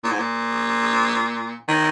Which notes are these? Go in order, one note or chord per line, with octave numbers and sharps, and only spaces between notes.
A#2
G#2
A#2
D#3